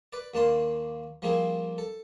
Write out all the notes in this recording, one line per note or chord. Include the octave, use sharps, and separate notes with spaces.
B4 D5
D#2 A#3 D4 A5 C6
F3 G3 A#3 C4 G#4
A4